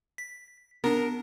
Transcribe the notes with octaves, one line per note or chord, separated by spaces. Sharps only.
B6
B3 D4 A#4